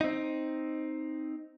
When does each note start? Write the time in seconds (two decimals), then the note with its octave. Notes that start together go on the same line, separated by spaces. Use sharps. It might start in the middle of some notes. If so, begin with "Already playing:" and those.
0.01 C4 D#4